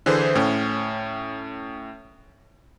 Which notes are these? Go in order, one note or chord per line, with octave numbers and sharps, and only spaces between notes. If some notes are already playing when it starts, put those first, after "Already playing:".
D3 E3 G#4 B4 C5
A2 C#4